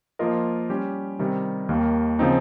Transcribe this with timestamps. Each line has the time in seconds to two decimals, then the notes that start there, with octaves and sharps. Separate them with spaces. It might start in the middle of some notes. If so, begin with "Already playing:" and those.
0.19 F3 A#3 F4 A#4 D#5
0.70 G3 C#4 G4
1.19 C3 D#3 G3
1.69 D#2 D#3 A#3
2.19 C#3 F3 C4 D#4